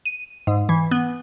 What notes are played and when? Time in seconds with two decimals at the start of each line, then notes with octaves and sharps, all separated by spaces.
0.05 D#7
0.47 G#2
0.69 E3
0.91 B3